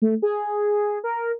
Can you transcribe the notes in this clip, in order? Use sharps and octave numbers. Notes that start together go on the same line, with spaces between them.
A3
G#4
A#4